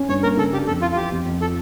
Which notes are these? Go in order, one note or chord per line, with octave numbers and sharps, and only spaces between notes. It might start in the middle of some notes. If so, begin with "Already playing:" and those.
Already playing: C#4
G2 C#5
A#3 A#4
C#3 A4
D4 G4
F2 A4
E4 F4
F4
E3 G4
F2
F2
F4 A4